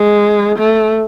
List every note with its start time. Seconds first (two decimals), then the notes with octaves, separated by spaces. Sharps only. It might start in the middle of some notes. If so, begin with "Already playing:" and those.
Already playing: G#3
0.59 A3